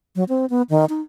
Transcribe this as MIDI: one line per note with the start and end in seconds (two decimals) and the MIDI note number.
0.16 0.24 54
0.29 0.46 60
0.50 0.62 59
0.70 0.85 51
0.89 1.00 63